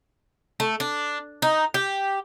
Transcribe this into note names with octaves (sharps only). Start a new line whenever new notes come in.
A3
D4
D#4
G4